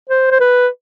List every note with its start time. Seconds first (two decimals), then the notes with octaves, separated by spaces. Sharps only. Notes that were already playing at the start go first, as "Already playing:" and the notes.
0.10 C5
0.31 C5
0.40 B4